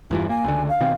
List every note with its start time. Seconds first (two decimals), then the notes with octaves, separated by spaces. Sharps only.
0.11 E2 G2 E3 F4
0.29 A#3 G#5
0.44 C#2 D3
0.69 F5
0.81 B2 D#3 C4